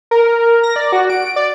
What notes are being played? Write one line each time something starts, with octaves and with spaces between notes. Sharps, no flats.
A#4
A#6
D5
F#4
D7
D5